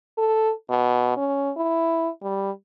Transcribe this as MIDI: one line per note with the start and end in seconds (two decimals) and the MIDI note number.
0.18 0.52 69
0.70 1.12 47
1.17 1.51 61
1.57 2.09 64
2.23 2.51 55